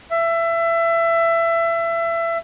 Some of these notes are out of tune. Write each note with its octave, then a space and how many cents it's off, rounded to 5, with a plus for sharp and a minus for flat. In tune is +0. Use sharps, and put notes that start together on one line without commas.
E5 +25